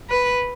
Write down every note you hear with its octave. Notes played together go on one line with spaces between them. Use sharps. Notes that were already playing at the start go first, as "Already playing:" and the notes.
B4